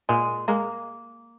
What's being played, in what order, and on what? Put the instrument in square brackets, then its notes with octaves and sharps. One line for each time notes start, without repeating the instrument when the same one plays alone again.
[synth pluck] A#2 [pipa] G#3
[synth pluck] G#3 [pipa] A#3